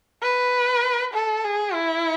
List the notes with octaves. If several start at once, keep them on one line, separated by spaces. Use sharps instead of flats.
B4
A4
G#4
E4